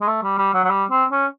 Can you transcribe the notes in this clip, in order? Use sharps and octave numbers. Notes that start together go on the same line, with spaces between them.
G#3
A3
G3
G3
F#3
F#3
G3
C4
C#4